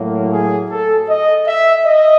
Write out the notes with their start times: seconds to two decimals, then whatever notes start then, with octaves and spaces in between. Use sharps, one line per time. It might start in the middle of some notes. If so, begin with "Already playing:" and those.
Already playing: A2 F#3 A#3
0.33 G#4
0.71 A4
1.09 D#5
1.47 E5
1.86 D#5